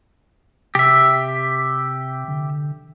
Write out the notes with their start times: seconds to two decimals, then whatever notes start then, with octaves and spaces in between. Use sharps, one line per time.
0.75 C3 G4 E5
2.28 D3